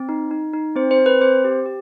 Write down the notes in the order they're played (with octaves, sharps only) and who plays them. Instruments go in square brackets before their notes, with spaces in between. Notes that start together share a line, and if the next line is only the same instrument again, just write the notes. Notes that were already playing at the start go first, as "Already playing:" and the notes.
Already playing: [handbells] C4
D#4
D#4
D#4
C4 C5
C5
C4
B4
C4 C5
G4
G4